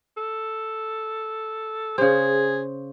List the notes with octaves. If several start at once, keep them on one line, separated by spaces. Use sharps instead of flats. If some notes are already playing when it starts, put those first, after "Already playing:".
A4
C#3 G#4 C5